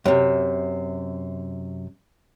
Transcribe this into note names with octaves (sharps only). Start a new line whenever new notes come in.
F#2 C3